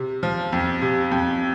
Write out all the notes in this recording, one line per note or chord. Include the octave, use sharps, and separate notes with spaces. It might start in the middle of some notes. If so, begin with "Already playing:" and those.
Already playing: C3
F3
F2
C3
F2